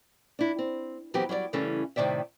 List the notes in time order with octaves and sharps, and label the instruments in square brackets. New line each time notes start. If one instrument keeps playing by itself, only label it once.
[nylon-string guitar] D4 E4
C4
E3 F#3 B3 C4 G4
F#3 G3 C#5 D5
C#3 E3 G3 A3 C#4 A4
A2 C3 D#3 D5 E5